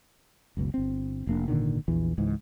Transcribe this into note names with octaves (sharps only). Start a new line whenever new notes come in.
F#1 C#2 B2
G1 C4
F1 A#3 D4
G#1 A#2 D3 D#3
A#1 E2 E3
C#2 G#2 E3